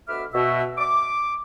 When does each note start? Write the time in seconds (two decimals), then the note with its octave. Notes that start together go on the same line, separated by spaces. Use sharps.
0.09 D2 B2 E5 B5 D6 F6
0.34 B2 E5
0.78 D6